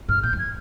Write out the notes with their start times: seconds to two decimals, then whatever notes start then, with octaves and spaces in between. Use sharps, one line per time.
0.09 G#2 F6
0.23 A2 G6
0.33 F2
0.39 G#6